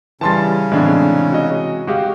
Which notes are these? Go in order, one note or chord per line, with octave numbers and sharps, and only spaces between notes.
C#3 E3 G3 C#4 A5 C6 A6
A2 C3 E3 G#3 D4
F#4 D#5
G#3 F#4 G4 F5